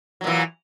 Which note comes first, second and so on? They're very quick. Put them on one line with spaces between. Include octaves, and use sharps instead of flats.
F#3 A#2 E3